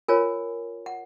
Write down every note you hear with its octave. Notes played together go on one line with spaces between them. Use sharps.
F4 A#4 C#5 G#5
F#5